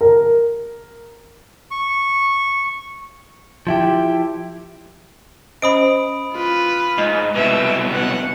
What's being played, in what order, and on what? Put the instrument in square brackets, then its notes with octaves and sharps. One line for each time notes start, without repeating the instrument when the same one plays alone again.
[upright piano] A#4
[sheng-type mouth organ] C#6
[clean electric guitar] F3 E4 G4
[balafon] C#4 C5 D#5 [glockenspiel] B5 D#6 D7
[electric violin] F4 B4
[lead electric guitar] G#2 [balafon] D#5
[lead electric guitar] C2 B2 [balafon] B4 [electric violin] E5
[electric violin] F#5